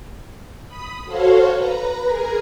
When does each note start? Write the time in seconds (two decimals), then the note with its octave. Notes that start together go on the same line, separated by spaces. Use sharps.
0.67 B5 D#6
1.05 F#4 A4 C5 C#5 F5
1.54 B4 A#5
2.05 G#4 A#4 A#5